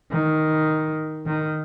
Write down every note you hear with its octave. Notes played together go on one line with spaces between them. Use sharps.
D#3
D#3